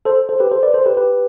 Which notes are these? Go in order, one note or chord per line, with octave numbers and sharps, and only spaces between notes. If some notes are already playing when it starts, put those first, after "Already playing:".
A4 C5
A4 C5
G4 B4
A4 C5
B4 D5
A4 C5
G4 B4
G4 B4